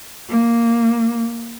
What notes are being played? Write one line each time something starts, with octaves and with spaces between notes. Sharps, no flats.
A#3